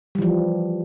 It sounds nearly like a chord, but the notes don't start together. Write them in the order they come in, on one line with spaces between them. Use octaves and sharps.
G3 E3 F3